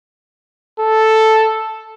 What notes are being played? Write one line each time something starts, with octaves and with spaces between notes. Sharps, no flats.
A4